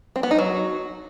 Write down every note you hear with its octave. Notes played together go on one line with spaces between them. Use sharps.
C4
B3
D#4
F#3